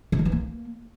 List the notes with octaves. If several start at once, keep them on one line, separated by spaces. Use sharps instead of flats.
D3
D#3
E3
A#3